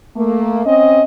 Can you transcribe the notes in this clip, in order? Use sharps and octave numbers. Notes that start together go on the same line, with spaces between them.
A3 A#3
C4 C#4 D#5